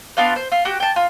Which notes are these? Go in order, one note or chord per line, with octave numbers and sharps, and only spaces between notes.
B3 D4 F4 F5
C5
F4
F#4 G4
G5 A5
F4